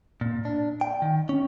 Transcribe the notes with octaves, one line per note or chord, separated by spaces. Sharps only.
A#2
D4
G5
D#3
C#4